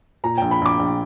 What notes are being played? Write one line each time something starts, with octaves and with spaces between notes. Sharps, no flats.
A#2 A#5
A#1 G5
B5
A#1 D6
A#1